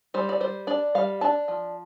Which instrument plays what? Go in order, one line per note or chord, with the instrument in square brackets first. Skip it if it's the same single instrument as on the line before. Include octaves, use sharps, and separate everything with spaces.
[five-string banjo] G3 C5
D5
G3 C5
D4 D5
G3 F5
D4 A5
F3